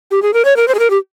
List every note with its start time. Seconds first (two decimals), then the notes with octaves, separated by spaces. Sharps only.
0.11 G4
0.22 G#4
0.34 A#4
0.45 C#5
0.56 A#4
0.68 C5
0.75 G#4
0.79 A#4
0.90 G4